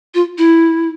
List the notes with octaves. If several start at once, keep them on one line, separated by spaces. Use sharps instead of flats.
F4
E4